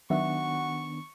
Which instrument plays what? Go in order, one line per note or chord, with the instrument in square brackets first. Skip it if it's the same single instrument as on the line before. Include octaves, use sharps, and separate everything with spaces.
[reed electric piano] D#3 B3 D4 [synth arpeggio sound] F#3 E5 [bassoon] F#4 [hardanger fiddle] C#6